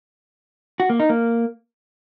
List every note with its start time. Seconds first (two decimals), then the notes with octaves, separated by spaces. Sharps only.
0.80 F#4
0.90 A#3
1.00 D#4
1.10 A#3